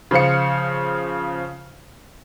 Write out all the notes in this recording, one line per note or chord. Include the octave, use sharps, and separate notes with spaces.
C#3 F3 C5 F5 C#7